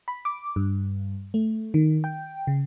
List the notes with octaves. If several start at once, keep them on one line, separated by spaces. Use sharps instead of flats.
B5
D6
G2
A3
D#3
G5
C#3